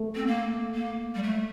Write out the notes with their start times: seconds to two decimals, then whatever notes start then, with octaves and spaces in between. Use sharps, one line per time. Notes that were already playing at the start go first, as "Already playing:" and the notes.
Already playing: A3
0.15 C4
0.27 A#3
0.74 A#3
1.15 G3
1.23 A3